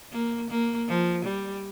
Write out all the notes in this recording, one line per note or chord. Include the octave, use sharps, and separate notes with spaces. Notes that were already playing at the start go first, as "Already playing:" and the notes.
A#3
A#3
F3
G3